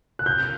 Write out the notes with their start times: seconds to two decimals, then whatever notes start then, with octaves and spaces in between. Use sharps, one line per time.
0.19 F#6
0.26 C4 F4 A#4 G6